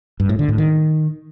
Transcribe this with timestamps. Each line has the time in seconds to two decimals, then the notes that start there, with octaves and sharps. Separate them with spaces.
0.20 G2
0.29 A2
0.39 D3
0.49 A2
0.58 D#3